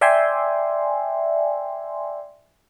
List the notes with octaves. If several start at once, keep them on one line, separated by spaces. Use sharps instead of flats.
D5 E5 G5 G#5 C6